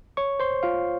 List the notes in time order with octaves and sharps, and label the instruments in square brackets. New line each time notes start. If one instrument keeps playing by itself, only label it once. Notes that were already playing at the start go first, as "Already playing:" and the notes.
[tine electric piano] C#5 C#6
C5 C6
F4 F5